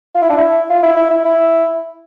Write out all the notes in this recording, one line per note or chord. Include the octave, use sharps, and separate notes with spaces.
F4
E4
D4
E4
F4
E4
E4
E4
E4